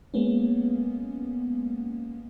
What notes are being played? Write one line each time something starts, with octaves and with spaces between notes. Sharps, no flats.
G#3 A#3 B3 C#4